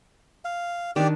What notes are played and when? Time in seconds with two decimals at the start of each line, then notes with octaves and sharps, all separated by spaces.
0.45 F5
0.96 D#3 D4 G4 D5